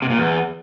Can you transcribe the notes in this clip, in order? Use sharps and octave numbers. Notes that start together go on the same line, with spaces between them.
C3
A#2
E2